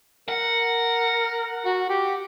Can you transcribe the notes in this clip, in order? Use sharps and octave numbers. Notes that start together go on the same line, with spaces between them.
A#4 F#5
F#4
G4